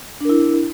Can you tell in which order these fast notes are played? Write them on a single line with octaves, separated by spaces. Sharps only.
D4 A#4 E4